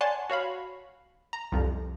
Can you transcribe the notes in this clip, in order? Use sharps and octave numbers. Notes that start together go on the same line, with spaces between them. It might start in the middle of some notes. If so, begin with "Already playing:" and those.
C#5 D5 F#5 G#5 A5 C6
F#4 C#5 F5 B5
A#5
C2 F2